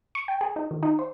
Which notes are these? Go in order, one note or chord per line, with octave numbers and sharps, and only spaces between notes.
C#6
G5
G#4
D#4
D#3
D#4
C5